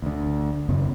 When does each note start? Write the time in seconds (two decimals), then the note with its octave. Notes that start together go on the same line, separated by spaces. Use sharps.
0.02 D2 D3
0.69 G#1 F#2 C#3 B3